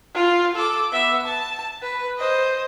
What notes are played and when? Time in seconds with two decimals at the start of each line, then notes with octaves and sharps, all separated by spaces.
0.15 F4
0.56 A4 D6
0.92 B3 E5
1.25 A5
1.82 B4
2.18 C5 D#5